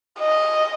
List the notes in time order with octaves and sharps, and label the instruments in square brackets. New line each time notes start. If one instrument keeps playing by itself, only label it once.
[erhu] D#5